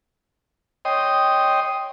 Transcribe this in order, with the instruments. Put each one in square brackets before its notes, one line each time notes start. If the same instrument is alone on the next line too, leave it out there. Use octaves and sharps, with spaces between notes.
[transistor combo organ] C#5 D#5 G5 C6 D#6